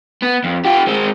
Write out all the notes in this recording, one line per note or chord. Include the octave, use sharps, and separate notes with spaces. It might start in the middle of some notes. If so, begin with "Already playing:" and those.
B3
F2
F4 G4
G#3 C4